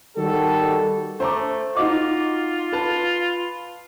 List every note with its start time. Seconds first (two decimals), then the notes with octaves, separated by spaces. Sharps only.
0.16 D#3 G3 F#4 A4
1.20 A3 C5 A#5 D6
1.77 D#4 F4 F#4 D#5 D6
2.73 B4 A5